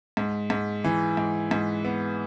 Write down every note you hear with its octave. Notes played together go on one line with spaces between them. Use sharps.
G#2
G#2
E3
G#2
G#2
B3